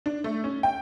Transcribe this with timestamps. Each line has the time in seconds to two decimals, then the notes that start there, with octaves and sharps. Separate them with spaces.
0.06 D4
0.24 A3
0.44 C#4
0.63 G5